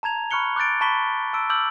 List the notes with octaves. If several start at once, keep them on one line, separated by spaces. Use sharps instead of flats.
A5 A#5 G#6 F7
B5 C#6 F6 F#6 C#7 G7
D6 F#6 G6 A6 D7
A5 B5 C#6 B6 G7
A5 E6 D7
D6 E6 F6 G6 F#7